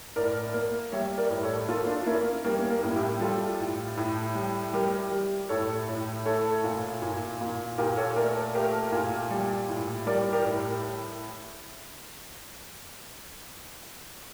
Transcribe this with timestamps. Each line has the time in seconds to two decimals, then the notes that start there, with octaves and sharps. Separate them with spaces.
0.16 A2 A#4 D5
0.54 A#3
0.92 G3 C#5 E5
1.17 A#4 D5
1.30 A2
1.43 A4 C#5
1.68 A#3 F4 A4
1.87 D4 F4
2.06 A#3 C#4 E4
2.45 G3 A#3
2.59 C#4
2.70 A#3
2.83 A2
2.96 E4 G4
3.21 G3 F4 A4
3.59 A2
3.97 A2
4.35 G3
4.73 G3 G4 A#4
5.12 G3
5.49 A2 A4 C#5
5.88 A2
6.25 A3 A4 C#5
6.64 A#2
7.02 A#2
7.41 A#2
7.78 A#2 G4 A#4
7.97 A4 C#5
8.16 A3 A#4 D5
8.55 A3 G4 A#4
8.92 A#2
9.31 G3
9.69 A2
10.07 G3 A#4 D5
10.33 G4 A#4
10.45 A2